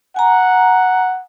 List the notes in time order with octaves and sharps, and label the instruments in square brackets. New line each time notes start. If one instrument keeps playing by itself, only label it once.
[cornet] F#5 [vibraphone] G#5 A#5